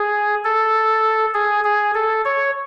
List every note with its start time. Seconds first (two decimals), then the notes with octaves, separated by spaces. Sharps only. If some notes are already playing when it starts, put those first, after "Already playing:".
Already playing: G#4
0.44 A4
1.34 G#4
1.64 G#4
1.94 A4
2.25 C#5